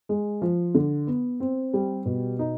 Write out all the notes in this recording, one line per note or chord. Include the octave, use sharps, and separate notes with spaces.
G#3
F3
D3
B3
C4
G3
B2
D#4